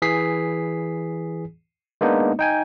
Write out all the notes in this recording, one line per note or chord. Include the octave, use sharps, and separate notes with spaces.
E3 G#4 B6 C7
G#3 A#3 B3 D4 D#4
D#4 G5 G#5